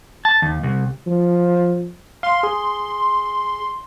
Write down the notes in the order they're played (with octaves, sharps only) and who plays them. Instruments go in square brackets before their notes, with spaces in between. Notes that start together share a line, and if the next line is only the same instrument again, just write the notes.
[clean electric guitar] A5
D#2
C2
[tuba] F3
[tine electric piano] F5 [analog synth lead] C6
[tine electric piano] G#4